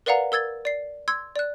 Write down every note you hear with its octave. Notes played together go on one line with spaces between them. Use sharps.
A#4 B4 D5 F5 F#5 A#5
A#4 E6 G#6 A6 G7
D5 C7
C6 E6 G#6
D5 F#6